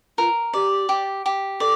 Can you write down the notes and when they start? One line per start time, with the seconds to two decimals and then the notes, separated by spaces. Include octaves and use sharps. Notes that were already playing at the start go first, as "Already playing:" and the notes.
0.18 F4 A#4
0.54 G4 D5
0.89 G4
1.26 G4
1.60 A4 D5